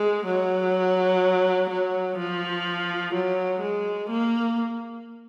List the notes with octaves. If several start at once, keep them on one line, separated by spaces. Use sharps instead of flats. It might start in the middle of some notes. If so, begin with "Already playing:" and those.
Already playing: G#3
F#3
F#3
F3
F#3
G#3
A#3